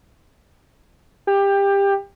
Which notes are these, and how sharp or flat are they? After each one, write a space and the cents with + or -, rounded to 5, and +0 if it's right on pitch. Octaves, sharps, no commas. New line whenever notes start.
G4 +20